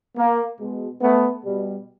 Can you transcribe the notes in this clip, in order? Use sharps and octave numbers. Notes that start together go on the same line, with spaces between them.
A#3
B2 G#3
A3 B3
B2 G3